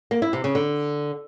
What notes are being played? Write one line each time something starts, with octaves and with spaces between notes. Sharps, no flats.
A#3
E4
C3
C#3
D3